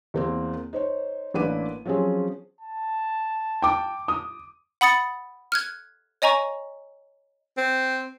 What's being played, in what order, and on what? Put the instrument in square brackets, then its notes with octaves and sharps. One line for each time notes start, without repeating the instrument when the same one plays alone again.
[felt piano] E2 A#3 C4
D#4 C5 C#5
A1 A#3 D4 B4 D6 D#7
F3 F#3 C4 C#4 G#4
[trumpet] A5
[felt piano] G5 D6
D#6
[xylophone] F#5 B5 D#6 A6 C#7
F6 F#6 G#6
C#5 D#5 G#5 A#5 C#6
[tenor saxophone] C4